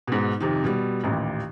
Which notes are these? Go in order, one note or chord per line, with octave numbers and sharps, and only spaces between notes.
G#2 B2
F2 C3 D#3
B2 G3
A1 D#2 A#2